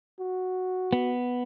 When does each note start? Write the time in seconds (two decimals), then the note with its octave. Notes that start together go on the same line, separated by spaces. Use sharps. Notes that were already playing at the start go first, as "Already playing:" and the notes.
0.20 F#4
0.93 B3